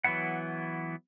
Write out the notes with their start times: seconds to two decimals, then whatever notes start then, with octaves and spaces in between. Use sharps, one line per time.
0.04 E3 F#3 B3 E4 F#5